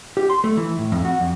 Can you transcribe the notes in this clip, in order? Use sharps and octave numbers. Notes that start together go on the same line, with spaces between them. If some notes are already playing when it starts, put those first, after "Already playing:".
G4
C6
A3
E3
A2
F2
F#4
F2